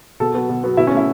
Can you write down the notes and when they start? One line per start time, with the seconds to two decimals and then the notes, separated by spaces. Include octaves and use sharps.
0.20 B2 A4
0.34 F#3 B3
0.49 B2
0.64 F#3 B3
0.77 B2 E4
0.87 C#4
0.92 A3
0.97 E4